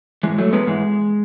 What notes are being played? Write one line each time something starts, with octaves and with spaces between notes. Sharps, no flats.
G#2 E3 G#3
F#3 A3
G#3 B3
G#2 E3 G#3